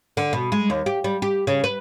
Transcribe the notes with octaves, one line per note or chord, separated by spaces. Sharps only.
D3
B2
G#3
D#2
G4
G3
G4
C#3
B4